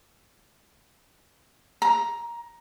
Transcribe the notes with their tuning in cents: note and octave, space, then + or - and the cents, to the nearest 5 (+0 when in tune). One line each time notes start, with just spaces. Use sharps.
A#5 +10